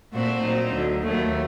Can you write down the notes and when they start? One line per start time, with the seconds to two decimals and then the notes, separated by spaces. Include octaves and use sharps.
0.11 A#2 A3 C4 F#4 C5
0.41 A#2 F#3 C4 D#4
0.72 D2 D3 F#3
1.03 D#2 D#3 F#3 A3